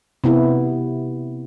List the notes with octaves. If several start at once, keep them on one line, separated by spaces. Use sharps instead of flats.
C3 B3 E4